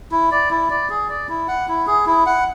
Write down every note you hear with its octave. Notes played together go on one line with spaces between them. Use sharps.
E4
D5
E4
D5
G#4
D5
E4
F#5
E4
G#4
E4
F#5